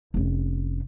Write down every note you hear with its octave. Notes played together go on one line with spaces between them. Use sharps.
F1 C#4